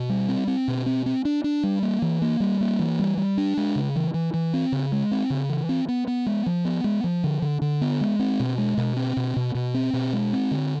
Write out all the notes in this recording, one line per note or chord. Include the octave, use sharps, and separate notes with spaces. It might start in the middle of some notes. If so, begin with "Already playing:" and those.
Already playing: B2
G3
C4
C4
B2
C4
C4
D4
D4
G3
A#3
E3
A#3
G3
A#3
E3
G3
G3
D4
G#3
C#3
E3
E3
E3
C4
C#3
G#3
C4
C#3
E3
C4
B3
B3
G#3
F3
B3
G#3
F3
D3
D3
D3
B3
G#3
C4
B2
G#3
B2
C4
B2
B2
B2
C4
B2
G#3
C4
D3